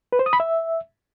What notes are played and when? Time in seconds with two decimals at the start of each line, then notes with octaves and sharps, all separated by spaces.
0.12 B4
0.19 C5
0.26 D#6
0.33 B5
0.40 E5